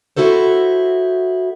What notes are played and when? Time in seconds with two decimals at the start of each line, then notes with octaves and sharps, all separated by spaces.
0.16 B3 E4 F#4 A4 C5